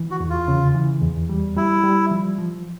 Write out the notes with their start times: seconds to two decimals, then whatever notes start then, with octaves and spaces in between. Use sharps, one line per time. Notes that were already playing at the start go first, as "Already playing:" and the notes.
Already playing: E3
0.11 F#4
0.20 E2
0.30 F4
0.48 C#3
0.75 E3
1.02 E2
1.30 G3
1.57 G3 E4
1.84 G3
2.11 F3
2.38 F3